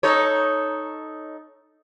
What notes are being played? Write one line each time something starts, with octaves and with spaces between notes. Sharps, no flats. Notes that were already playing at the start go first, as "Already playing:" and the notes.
D#4 A4 C#5